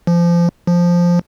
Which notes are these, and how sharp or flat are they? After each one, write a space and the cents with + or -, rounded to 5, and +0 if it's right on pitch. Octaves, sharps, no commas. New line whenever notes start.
F3 -25
F3 +0